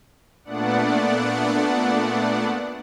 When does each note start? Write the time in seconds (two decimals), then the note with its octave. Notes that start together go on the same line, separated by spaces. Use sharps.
0.44 A#2 A3 B3 D4 D5 F#5